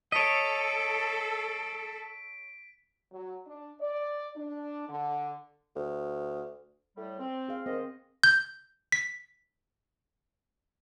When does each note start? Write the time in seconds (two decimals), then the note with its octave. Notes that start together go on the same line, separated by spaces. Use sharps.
0.12 A4 C#5 D#5 B6 D7
3.12 F#3
3.46 D4
3.80 D5
4.37 D4
4.89 D3
5.75 D2
6.97 A2 G3
7.19 C4
7.48 G#4 F5
7.66 G#2 D#3 C4 C5 D#5
8.24 G6
8.92 B6